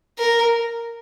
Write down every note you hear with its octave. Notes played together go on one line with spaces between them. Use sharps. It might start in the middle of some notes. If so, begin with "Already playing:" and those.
A#4